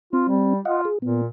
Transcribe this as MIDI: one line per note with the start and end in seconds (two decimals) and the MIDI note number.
0.13 0.53 60
0.13 0.23 65
0.28 0.60 55
0.65 0.88 65
0.65 0.81 75
0.65 0.81 77
0.65 0.81 78
0.85 0.98 68
1.02 1.26 46
1.02 1.21 59